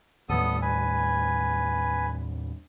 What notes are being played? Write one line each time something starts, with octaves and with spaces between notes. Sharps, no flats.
D#2 A2 G3 B3 A4 D#6
B4 G#5